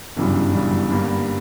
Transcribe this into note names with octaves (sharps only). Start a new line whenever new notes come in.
G1 F#2 C#3 E3 G3
G1 F#2 C#3 E3 G3
G2 D3 G3 A#3